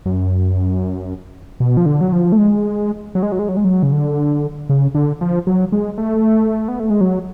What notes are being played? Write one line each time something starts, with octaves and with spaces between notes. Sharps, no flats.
F#2
B2
F3
D3
F#3
F3
A3
G#3
F#3
G#3
F#3
G#3
F#3
G#3
F#3
C#3
D3
C#3
D3
F3
F#3
G#3
A3
B3
A3
G#3
F#3